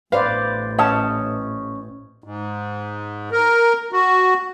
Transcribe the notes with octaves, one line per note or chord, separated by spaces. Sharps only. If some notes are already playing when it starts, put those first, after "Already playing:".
A1 B4 C5 D5 F5
C#4 C#5 D#5 A5
G#2
A#4
F#4